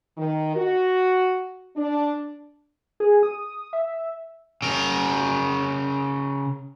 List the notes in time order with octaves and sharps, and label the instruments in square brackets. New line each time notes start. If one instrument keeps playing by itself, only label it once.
[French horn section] D#3
F#4
D4
[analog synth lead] G#4
D#6
E5
[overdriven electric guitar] C#3 A#4